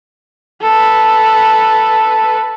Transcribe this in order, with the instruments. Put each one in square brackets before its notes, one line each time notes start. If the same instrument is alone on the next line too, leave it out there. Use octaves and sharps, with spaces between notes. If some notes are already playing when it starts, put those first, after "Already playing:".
[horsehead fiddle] A4 B4